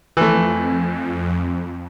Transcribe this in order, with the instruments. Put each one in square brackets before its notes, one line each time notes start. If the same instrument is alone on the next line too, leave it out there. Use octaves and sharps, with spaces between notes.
[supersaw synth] F2 [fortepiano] E3 A3